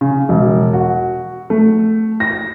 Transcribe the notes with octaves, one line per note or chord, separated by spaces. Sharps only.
C#3
E1
F#4
A3
A#6